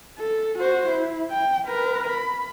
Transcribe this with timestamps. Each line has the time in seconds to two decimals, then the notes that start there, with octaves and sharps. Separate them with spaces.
0.18 A4
0.59 F#4 C5
0.89 E4
1.31 G5
1.67 A#4 B4
2.10 B5